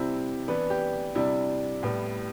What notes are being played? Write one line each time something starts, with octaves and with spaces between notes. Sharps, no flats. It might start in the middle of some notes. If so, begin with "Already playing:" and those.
Already playing: C3 G3 C4 E4
E3 B3 D4 B4
G4
C3 G3 D4 E4
A2 G3 B3